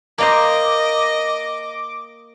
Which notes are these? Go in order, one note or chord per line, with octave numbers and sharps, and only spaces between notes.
A#3 A#4 C5 D#5 D6